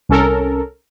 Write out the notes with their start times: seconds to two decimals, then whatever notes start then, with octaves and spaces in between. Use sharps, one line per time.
0.09 C2 C#4 A4 A#4